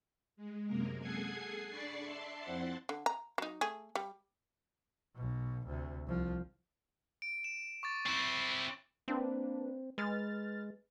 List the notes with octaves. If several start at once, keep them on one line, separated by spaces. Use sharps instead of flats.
G#3
F#2 C3 G#3 A#3 A#4
G#4 A4 F#5 G#5 G#6 C7
D4 D5 B5 C#6 A6 C7
D5 E5 A5 C6
F2 C4 E4 C5 F#5 A6
D3
A#5
F#3 D#4
A3 G#4
G3
B1 B2
D2 C3
C2 F3
D7
E7
C#6 D6 A6
C4 E4 C#6 E7 F#7
A#3 C4 D4 B4
G#3 B4 F6 A6